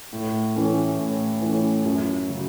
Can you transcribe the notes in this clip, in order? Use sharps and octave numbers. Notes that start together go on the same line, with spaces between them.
A2
E3 A3 C#4
A2
E3 A3 C#4
F#2
C#3 F#3